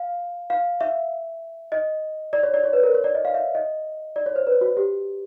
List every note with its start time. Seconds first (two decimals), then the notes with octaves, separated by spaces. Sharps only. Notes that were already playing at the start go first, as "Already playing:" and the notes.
Already playing: F5
0.50 F5
0.81 E5
1.72 D#5
2.33 D5
2.43 C#5
2.54 D5
2.64 C#5
2.73 B4
2.84 A#4
2.94 C#5
3.04 D5
3.15 D#5
3.25 F5
3.34 E5
3.55 D#5
4.16 D5
4.26 C#5
4.36 C5
4.47 B4
4.61 F#4
4.77 G4